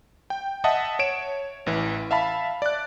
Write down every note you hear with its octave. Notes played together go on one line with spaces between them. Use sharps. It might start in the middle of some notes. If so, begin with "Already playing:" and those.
G5
D#5 E5 F#5 A5 D#6
C#5 D7 E7
A1 E3
E5 F5 A5 B5
D5 F#6